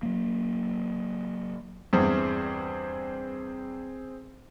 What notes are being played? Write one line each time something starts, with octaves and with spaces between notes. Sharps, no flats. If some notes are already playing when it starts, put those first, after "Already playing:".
F#3 A#3
E2 G2 C4 G#4 C5